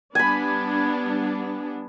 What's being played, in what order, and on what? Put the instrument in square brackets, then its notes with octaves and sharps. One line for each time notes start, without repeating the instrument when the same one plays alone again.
[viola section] G3 B3 D4 [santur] G#5 B5